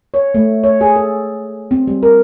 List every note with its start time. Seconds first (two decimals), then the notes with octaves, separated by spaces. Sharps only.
0.14 C#5
0.34 A3
0.64 C#5
0.81 G#4
0.96 A4
1.71 C4
1.87 G3
2.03 A#4